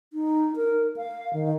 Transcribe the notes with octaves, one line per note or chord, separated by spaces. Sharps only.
D#4
A#4
F5
D#3